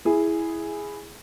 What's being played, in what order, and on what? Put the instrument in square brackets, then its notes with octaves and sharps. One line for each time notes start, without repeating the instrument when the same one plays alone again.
[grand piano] E4 G#4